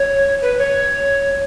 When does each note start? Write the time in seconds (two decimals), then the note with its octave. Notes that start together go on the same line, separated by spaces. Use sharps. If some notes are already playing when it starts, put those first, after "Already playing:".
Already playing: C#5
0.42 B4
0.58 C#5